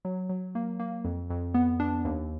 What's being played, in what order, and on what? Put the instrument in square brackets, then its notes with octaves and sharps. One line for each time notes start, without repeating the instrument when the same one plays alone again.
[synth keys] F#3
F#3
A#3
A#3
F2
F2
B3
D4
D#2